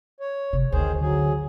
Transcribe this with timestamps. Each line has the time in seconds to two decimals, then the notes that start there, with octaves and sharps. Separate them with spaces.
0.20 C#5
0.53 G1 C3
0.72 G#1 D2 D#3 G#4 C5
1.01 D3 F#3 G#4